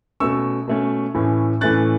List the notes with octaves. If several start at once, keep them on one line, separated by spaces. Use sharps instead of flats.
B2 A3 C#4 C#6 E6
B2 A3 C#4
A2 E3 A3 C#4
A2 E3 A3 C#4 F#6 A6